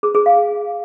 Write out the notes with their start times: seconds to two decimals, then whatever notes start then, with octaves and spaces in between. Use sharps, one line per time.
0.03 G#4
0.14 G#4
0.26 F5